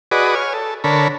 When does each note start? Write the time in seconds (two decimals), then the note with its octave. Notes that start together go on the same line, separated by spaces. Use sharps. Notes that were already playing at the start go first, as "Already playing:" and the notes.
0.11 F#4 G#4 B4 D5 D#5
0.35 C#5 G#5 F6
0.54 A4
0.84 D3 A4 A#4 C#5 B5